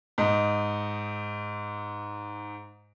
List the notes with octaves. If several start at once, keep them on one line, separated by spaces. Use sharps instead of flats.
G#2 D#5